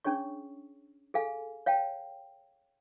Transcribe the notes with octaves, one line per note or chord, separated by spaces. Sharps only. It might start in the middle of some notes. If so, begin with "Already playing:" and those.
C#4 D4 G#4 C#5 C#6
G#4 A4 F5 G#5
C#5 F5 G5 A5